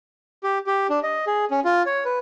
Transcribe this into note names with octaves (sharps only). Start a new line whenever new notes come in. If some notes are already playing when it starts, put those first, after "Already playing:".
G4
G4
D4
D#5
G#4
C#4
F4
C#5
B4